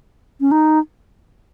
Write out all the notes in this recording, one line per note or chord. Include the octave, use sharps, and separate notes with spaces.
C#4
D#4